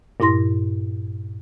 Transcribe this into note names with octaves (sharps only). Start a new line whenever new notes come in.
G2 A#2 E4 C6 A#6